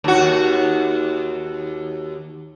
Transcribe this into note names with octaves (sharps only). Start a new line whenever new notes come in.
D#2 F#4